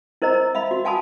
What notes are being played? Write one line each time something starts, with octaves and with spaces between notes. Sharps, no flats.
E4 A#4 C5 D#5 A#5
D#5
E5 F5 B5
F#4
F#4 F5 G#5 A5 B5 D#6